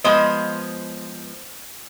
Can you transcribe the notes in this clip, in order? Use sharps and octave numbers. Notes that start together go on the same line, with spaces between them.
F3 G#3 B3 C5 D#5